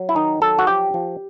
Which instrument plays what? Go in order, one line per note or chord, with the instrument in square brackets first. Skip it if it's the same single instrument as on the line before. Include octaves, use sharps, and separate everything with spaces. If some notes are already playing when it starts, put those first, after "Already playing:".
Already playing: [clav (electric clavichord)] F#3
E4
D#3 D#4
F#3 A4
F#4
F3 G4
F3